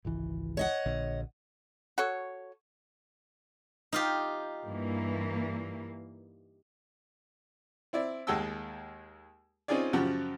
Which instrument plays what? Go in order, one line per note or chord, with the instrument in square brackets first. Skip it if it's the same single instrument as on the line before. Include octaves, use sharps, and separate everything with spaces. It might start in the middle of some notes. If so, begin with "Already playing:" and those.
[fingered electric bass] G#1 C#2 E3
[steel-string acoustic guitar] C#5 D#5 F#5
[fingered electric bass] A#1 D3
[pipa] F#4 A4 C#5
[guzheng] D#4 F4 G4
[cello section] G2 E3 A#3
[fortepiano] C4 E4 D5
D#2 G#3 F#5 G5 A5 E6
C4 C#4 D#4 F4 G#4 D5
F#2 C#3 F3 G4 F#5